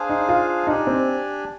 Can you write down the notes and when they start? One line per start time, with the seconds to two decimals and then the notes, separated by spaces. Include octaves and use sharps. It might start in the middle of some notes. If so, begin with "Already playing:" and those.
Already playing: D4 G#4 C5 F5 G#5
0.09 D#4
0.29 F4
0.67 D4 D#4 G4 D5 G#5
0.87 C4